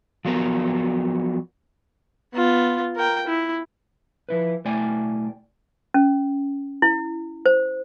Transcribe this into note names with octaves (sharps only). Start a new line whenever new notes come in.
F3 F#3 B3 A#4
B3 F4
A#4 G5
E4
F3 E4 B4
B1 A3 E4 D5 G5 G#5
C#4
E4
C5